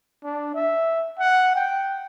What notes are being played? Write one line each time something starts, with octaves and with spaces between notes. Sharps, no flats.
D4
E5
F#5
G5